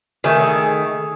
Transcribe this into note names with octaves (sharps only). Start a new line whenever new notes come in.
D#3 A3 G#4